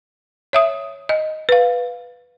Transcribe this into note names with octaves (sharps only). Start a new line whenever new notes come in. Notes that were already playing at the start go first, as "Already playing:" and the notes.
C#5 E5 D#6
D#5
B4 F5